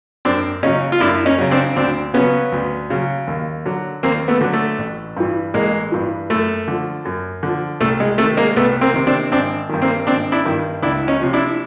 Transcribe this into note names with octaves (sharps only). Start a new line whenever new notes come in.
F#2 C4 D4
C#3 F#3 C#4 D#4
F4
F#2 D4 E4
C#4 D#4
C#3 F#3
C4 D4
D2 C4 D4
C#3 F#3 B3 C#4
D2
C#3 F#3
D#2
D3 F#3
D#2 A#3 C4
A3 B3
D3 F#3
A3
A1
G2 E3
A1 G#3 A#3
G2 E3
F#2 A3
D3 F3
F#2
D3 F3
C2 A3
G#3
C3 D#3 A3
G#3 A#3
C2 A3 B3
A#3 C4
C3 D#3
C4 D4
G#1 C4 D4
G2 D#3
A#3 C4
G#1 C4 D4
D4 E4
G2 D#3
C#2 D4 E4
C#4 D#4
C3 F3
D4 E4